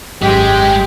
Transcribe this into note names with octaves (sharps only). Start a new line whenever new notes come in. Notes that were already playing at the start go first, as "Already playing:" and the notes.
G#1 F#2 G#3 G4 G5 B6